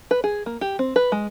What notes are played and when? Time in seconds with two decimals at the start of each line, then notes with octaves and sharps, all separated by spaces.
0.11 B4
0.24 G#4
0.46 A#3
0.61 G4
0.79 C4
0.96 B4
1.12 G#3